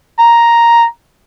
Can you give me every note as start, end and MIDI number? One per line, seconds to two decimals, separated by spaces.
0.19 0.83 82